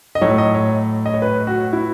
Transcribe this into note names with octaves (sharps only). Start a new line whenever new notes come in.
D#5
A2 F#3 A3 C#5
D#5
C#5
D#5
C#5
B4
F#4
E4